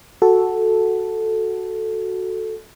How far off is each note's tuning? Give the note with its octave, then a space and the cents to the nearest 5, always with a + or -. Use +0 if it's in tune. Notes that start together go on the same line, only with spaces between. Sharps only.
F#4 +0 A4 +0